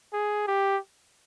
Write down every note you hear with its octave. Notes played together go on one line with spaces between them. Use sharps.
G#4
G4